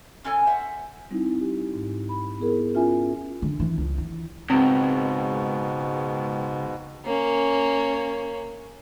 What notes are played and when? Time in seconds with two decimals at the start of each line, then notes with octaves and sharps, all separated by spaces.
0.24 C#3 C#4 E4 A4 G#5
0.46 C5 E5 F#5
1.11 G3 C4 D#4 E4
1.40 G4
1.74 G#2
2.09 B5
2.39 B3 E4 G#4 A#4
2.74 C#4 F4 E5 G#5
3.42 D3
3.60 E3
3.78 C#2
3.98 E3
4.50 C#2 G#2 B2 C4
7.05 A#3 C#4